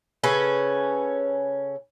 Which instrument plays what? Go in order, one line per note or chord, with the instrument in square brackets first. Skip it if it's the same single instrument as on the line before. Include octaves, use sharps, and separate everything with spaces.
[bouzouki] C#3 C#4 A4 B4